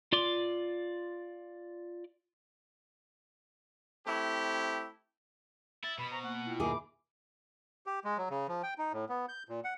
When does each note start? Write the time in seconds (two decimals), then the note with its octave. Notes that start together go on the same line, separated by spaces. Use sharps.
0.13 F4 D5 C6 D6
4.07 A3 C4 E4 G4
5.84 E4 A6
5.98 B2 B5
6.11 C5 A#5 C#6
6.23 A#3 F#5
6.46 E4 F4 G5
6.60 D#2 G#4 E5 B5 D6
7.86 G4
8.04 G#3
8.18 F#3
8.30 C#3
8.48 F3
8.63 G5
8.78 D#4
8.93 A2
9.09 B3
9.29 G6
9.49 A#2
9.64 F#5